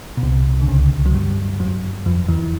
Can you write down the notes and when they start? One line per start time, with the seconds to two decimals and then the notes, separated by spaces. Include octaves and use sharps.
0.17 B2
0.23 C2 C3
0.61 D3
0.68 C#2 C#3
1.06 F#3
1.14 G2 G3
1.60 F#2 F#3
2.06 F2 F3
2.29 E2 E3